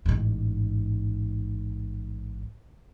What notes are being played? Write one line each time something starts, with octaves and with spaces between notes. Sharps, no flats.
A1 G#2